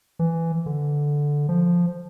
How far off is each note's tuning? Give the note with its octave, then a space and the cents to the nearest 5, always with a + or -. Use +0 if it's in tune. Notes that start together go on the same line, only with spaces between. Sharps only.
E3 +10
D3 -5
F3 +0